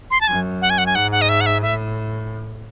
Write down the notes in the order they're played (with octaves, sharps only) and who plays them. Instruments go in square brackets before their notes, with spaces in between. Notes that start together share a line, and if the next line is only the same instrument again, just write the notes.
[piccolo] C6
A5
[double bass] F#2 [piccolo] G#5
[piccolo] F#5
G#5
F#5
G#5
[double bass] G#2 [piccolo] F#5
[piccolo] F#5
D#5
E5
F#5
E5
[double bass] A2 [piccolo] E5